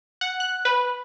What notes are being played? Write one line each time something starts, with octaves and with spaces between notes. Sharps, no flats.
F#5
F#6
B4